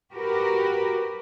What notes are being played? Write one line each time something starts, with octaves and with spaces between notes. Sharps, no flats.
F#4 G4 A#4 B4